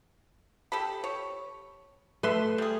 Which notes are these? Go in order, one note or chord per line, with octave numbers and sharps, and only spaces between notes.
G4 A4 B5
C#5
A3 B4 E5 C6
G3 G#4